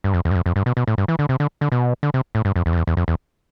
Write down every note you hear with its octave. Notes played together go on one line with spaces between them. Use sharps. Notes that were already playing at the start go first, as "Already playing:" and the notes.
G2
F2
E2
G2
F2
F2
G2
B2
B2
A2
G2
E3
D3
C3
D3
D3
B2
D3
C3
A2
G2
F2
E2
F2
E2
E2
F2
E2